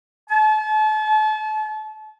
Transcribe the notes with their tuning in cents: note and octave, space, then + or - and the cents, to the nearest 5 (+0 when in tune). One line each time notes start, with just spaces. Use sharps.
A5 -35